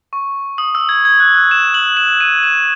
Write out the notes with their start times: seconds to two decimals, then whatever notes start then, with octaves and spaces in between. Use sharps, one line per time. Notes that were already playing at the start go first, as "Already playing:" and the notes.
0.13 C#6
0.58 D#6
0.75 E6
0.89 G#6
1.05 G#6
1.20 F#6
1.35 F#6
1.51 E7
1.74 F#7
1.97 E7
2.20 D#7
2.43 E7